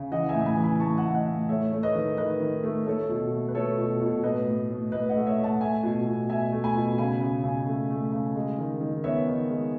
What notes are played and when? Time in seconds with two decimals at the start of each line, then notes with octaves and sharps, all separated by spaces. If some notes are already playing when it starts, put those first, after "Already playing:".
Already playing: C#3
0.12 E3 D#5 F#5
0.29 E5 G#5
0.34 A2
0.46 G#5 B5
0.57 E3
0.63 G#5 B5
0.80 A2 A5 C#6
0.98 F#5 A5
1.04 A2
1.14 D#5 F#5
1.26 A2
1.49 A3 C#5 E5
1.72 A3 C#5
1.83 B4 D#5
1.95 D#3
2.17 D#3 B4 D#5
2.40 D#3
2.63 A3
2.86 A3 A4 C#5
3.09 B2
3.32 A3
3.48 B4
3.55 A3 A4 C#5
3.78 B2
4.01 B2
4.23 A2 B4 D#5
4.46 A2
4.70 A2
4.92 A2 B4 D#5
5.09 D#5 F#5
5.15 A3
5.26 C#5 E5
5.38 A2
5.44 F#5 A5
5.61 A3 E5 G#5
5.83 B2
6.07 B2
6.30 B2 E5 G#5
6.52 A3
6.64 G#5 B5
6.75 B2
6.98 C#3 G#5 B5
7.21 C#3
7.44 C#3
7.67 A3
7.90 A3
8.12 C#3
8.36 G#3
8.58 D#3
8.81 D#3
9.04 B3 C#5 E5
9.27 D#3
9.50 G#3